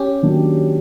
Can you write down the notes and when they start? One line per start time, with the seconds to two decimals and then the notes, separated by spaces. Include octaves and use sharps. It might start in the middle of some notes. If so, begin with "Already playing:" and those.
Already playing: C#4 G4
0.23 D#3 F#3 A#3 D4